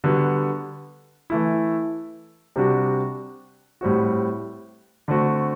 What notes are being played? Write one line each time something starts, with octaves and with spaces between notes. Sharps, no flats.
D3 G3 B3 F#4
E3 A3 E4
C3 G3 D4 F#4
A2 G3 C4 F#4
D3 A3 C4 F#4